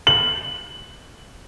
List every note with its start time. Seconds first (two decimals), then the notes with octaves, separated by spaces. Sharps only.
0.07 F#7